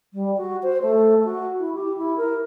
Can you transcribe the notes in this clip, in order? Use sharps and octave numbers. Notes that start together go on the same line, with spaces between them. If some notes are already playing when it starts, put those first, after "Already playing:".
G3
F#4
C5
A3
F#4
E4
G4
E4
A#4